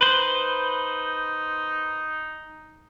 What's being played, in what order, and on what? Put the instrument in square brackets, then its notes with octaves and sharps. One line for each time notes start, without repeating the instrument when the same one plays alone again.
[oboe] D#4 [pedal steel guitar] B4 C5